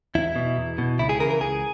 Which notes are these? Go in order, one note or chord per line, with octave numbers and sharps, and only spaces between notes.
E2 E4
B2
E2
B2
C#2 E4
G#4
C#3 E3 A#4
A#4
C#2 G#4